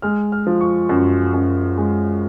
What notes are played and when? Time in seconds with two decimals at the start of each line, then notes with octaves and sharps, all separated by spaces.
0.02 G#3 F6
0.32 F6
0.47 F3
0.61 C#6
0.89 F#2
1.34 F#2
1.78 G#3